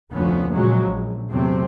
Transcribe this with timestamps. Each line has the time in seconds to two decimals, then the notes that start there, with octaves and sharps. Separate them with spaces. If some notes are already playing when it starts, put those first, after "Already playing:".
0.13 F1 D2 F3 B3 C#4
0.54 A#2 C#3 F3 F#3 G#3
0.87 A#1
1.31 E2 C3 F#3 A3 C4